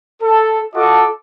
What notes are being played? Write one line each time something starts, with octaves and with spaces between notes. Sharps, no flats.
A4
F4 F#4 A4 D#5 A5 D6